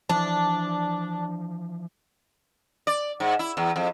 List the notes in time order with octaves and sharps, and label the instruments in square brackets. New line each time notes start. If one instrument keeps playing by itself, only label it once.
[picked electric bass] E3 F3 [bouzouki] D4
[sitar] D5
G#2
E4
E2
F2